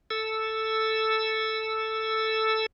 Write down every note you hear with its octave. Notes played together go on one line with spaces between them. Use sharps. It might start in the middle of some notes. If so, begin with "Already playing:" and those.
A4 E6